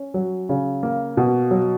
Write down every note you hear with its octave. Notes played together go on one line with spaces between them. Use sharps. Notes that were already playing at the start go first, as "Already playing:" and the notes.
Already playing: C#4
F#3
C#3
A#3
B2
F#3